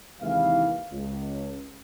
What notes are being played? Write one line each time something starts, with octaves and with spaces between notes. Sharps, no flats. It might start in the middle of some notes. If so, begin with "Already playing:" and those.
D#2 C3 E3 G#3 E4 F5
C#2